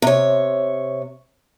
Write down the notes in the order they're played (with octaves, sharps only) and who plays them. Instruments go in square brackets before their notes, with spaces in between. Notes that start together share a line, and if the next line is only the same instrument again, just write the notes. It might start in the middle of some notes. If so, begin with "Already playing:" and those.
[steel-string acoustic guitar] C3 C#5